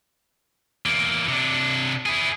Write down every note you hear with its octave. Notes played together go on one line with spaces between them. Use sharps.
E2 A#3
C3 D4
E4 G#4